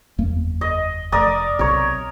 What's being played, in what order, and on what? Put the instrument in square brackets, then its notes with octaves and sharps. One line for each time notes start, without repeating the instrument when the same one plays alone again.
[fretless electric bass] F#1 E2 A#3
[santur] D#5
[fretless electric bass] F1 [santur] A#4 D5 D#6
[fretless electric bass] B1 C3 [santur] A#4 C#5